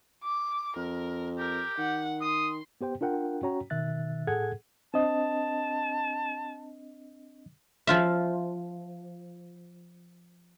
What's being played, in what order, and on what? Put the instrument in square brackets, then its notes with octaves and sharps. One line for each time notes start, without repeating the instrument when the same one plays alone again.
[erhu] D6
[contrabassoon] F2 [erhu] A#4
[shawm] G4 [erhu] A#4
[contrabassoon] D#3 [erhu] F#5
[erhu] C6 [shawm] D#6
[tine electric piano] B3 G4 C5 G5
D4 F4 A#4 F#5 G5
C#4 F#4 C#5 G5 A#5
B2 D#3 E5 F#6 A6
A2 G#4 A4 F#5 G#6
[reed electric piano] C4 D4 D#5 [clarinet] A5
[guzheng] F3 F4 E5